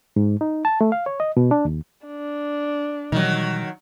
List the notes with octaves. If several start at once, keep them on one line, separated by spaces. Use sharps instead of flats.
G#2
D#4
A5
A3
F5
C#5
D#5
B2
D4
D#2
D4
B2 D#3 E3 F#3 G3